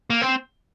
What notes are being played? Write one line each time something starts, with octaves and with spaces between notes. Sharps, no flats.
A#3
C4